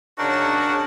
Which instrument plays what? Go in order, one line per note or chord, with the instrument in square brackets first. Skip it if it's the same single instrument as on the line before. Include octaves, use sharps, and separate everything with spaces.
[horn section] C#3 D4 C#5 [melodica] D#4 A#4 [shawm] F#4 [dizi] A5